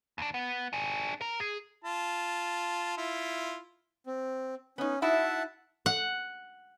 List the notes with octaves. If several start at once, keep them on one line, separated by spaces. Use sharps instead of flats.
D#2 D4
B3
D4 G#4
A#4 A#5
G#4
F4 A5
E4 F4
C4
B3 C#4 D#4
D#4 E4 F#4 E5 F#5 A5
F#5